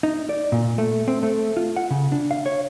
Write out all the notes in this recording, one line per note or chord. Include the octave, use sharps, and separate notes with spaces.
D#4
D5
A#2
A3
C4
A3
F4
F#5
C#3
D4
F5
C#5